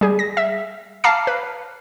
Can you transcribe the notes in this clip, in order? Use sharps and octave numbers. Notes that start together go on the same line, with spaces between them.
G3 G#4
A#6
E5
F5 A5 A#5 D6 F6 C7
B4